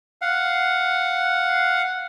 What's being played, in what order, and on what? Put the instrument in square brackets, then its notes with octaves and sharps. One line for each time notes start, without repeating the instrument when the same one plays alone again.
[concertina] F5 F#5